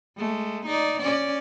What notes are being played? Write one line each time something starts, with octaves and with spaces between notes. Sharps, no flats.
G#3 A3
D#4 D5
C#4 D5